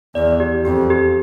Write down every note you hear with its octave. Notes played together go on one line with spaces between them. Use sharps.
E2 D5
G4
F2 G4
G4